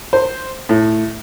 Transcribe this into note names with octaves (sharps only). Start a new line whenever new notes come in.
C5
A2